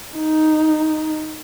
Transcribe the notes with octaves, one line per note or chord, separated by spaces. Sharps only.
D#4